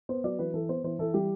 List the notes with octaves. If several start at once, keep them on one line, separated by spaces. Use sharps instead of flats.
B3 C5
F#3 D5
E3 B4
E3 A4
B3 C5
E3 C5
E3 A4
G3 G4